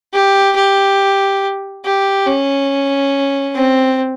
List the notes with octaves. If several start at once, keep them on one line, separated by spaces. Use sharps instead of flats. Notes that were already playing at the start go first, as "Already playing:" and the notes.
G4
G4
G4
C#4
C4